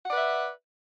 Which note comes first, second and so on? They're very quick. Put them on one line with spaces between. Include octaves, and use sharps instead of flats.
F#5 D5 B4 E5